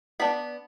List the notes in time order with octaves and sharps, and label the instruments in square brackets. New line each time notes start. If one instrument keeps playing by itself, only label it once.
[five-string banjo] B3 D4 B5